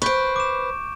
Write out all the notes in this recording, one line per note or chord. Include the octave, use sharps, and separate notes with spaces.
B4 C5 C#6 G6 D7
D6 E7